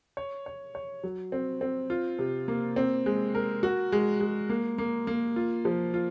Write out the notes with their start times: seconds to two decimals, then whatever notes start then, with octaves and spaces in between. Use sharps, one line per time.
0.17 C#5
0.46 C#5
0.75 C#5
1.03 F#3
1.32 C4
1.61 C4
1.90 F4
2.19 C3
2.48 A#3
2.76 C4
3.06 G#3
3.35 A#4
3.63 F#4
3.92 G#3
4.20 G#3
4.49 A#3
4.78 A#3
5.07 A#3
5.36 F4
5.65 F3
5.94 F4